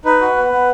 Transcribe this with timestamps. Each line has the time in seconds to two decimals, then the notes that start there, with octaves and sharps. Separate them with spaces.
0.05 D#4 B4
0.21 F#4
0.36 B3
0.52 B3